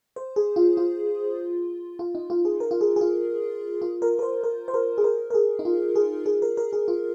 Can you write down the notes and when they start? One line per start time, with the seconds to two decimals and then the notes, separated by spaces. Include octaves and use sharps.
0.16 C5
0.36 G#4
0.56 F4
0.77 F4
1.99 F4
2.15 D#4
2.30 F4
2.45 G#4
2.60 A#4
2.71 F4
2.81 G#4
2.96 G#4
3.01 F4
3.82 F4
4.02 A#4
4.19 A#4
4.23 C5
4.44 A#4
4.68 C5
4.74 A#4
4.98 G#4
5.04 A#4
5.30 A#4
5.34 G#4
5.59 D#4
5.65 F4
5.96 G#4
6.26 G#4
6.42 A#4
6.57 A#4
6.73 G#4
6.88 F4